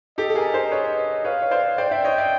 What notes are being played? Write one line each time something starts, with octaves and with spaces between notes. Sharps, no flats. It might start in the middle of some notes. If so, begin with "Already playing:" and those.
G4 A4 D#5
A4
G#4 A#4
A#4 C5
B4 C#5
B4 C#5 F5
C#5
C5 D5
C5 D5 G5
D5 E5
C#5 D#5
D5 E5